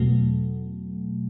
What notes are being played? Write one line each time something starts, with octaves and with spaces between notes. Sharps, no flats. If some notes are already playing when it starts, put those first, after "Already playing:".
Already playing: E2 B2 F#3 A3